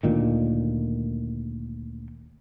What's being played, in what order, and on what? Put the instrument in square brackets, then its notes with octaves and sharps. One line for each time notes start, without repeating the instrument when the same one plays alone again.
[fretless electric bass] D2 A#2 D#3